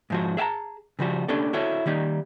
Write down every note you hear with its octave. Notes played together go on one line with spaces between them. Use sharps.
G#2 F3 F#4
G#4 E5 G5 A5 A#5
C#3 F3 G3 F#4
A#3 C#4 D4 G4 A4 D5
E4 F#4 A4 C#5
D#3 G3 A#3 D#4